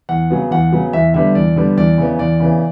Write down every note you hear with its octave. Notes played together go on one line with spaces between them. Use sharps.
E2 F#5
C#3 F#3 B3
E2 F#5
C#3 F#3 B3
E2 E5
D3 G3 B3 E5
E2 D5
D3 G3 B3
E2 D5
C#3 E3 B3
E2 D5
C#3 E3 B3